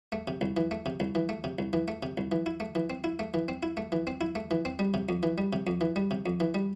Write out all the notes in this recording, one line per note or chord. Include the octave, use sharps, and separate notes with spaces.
A3
C3
C2
E3
A3
C3
C2
E3
A3
C3
C2
E3
A3
C3
C2
E3
E4
A3
E3
C4
E4
A3
E3
C4
E4
A3
E3
C4
E4
A3
E3
C4
G3
C3
F2
E3
G3
C3
F2
E3
G3
C3
F2
E3
G3